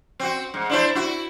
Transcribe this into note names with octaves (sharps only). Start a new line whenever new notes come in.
C4 F#4
G#2
D4 E4 C5
E4 F#4